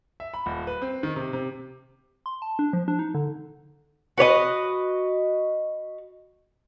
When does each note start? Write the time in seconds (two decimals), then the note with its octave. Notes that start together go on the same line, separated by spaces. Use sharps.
0.20 E5
0.34 B5
0.46 D#1
0.67 B4
0.82 C4
1.03 D#3
1.16 C3
1.33 C3
2.26 C6
2.42 A5
2.59 D4
2.73 F3
2.88 D4
2.99 D#4
3.15 D3
4.18 F#4 B4 C#5 D#5